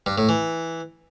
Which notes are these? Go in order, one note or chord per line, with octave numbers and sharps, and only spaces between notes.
G2
A2
E3